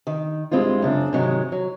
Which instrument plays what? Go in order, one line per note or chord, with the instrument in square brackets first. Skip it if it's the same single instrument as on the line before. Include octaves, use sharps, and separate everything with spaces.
[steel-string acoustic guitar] D#3
G2 G#3 C4 E4 F4
F#2 C#3 D4
G#2 C3 D#3 F#3 G#3
F#3